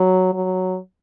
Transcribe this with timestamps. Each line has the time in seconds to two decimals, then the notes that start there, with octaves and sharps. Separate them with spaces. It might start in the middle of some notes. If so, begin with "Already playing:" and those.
Already playing: F#3
0.34 F#3